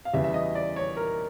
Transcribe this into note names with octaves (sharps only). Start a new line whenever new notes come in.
F5
E2 C#3 E3 G3 E5
E5
D#5
D5
C#5
A#4